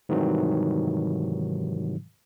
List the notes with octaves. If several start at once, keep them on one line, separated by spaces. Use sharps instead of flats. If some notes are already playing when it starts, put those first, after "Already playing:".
G#2 C3 D#3 E3 F#3 G3